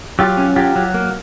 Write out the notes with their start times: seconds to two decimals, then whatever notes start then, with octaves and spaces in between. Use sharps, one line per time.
0.19 F#3 F4 G4
0.37 C#4
0.56 F#3 F4 G4
0.76 F#3
0.94 A#3